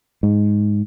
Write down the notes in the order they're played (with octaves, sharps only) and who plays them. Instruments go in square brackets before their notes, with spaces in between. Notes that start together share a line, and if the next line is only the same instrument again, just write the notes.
[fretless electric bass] G#2